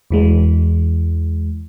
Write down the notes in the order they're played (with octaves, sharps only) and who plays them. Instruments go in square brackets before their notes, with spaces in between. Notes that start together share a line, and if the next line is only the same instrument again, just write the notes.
[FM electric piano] E2 E3 G#3